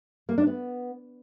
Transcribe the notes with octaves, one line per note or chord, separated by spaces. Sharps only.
A#3
D4
B3